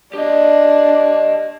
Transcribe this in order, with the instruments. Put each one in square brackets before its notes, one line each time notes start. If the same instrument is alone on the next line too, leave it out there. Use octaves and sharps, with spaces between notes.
[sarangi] D4 [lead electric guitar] G4 D#5